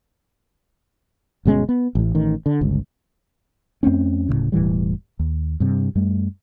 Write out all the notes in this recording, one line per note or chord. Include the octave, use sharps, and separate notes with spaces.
G1 B2 G#3 C#4
B3
A1 A2
A1 D#3
D3
G1 C#2
F2 A3 C4 C#4
D1 D#2 A2 C#3
E1 A2 E3 G3
D#2
G2 C3
F#2 G3 A3